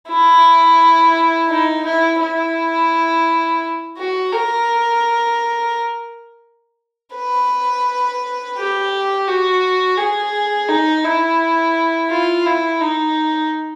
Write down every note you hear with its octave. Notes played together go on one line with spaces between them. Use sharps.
E4
D#4
E4
E4
F#4
A#4
B4
G4
F#4
G#4
D#4
E4
F4
E4
D#4